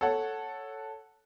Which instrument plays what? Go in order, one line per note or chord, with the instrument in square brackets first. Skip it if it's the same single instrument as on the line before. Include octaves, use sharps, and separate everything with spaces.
[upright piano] A4 C#5 F#5